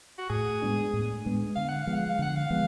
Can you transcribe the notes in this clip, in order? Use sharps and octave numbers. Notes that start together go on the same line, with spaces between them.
F#4
A2 G#4
G#3 B3 D4
A2
G#3 B3 D4
D3 F5
F#5
F3 G#3 B3 F5
F#5
F5
D3 F#5
F5
F3 G#3 B3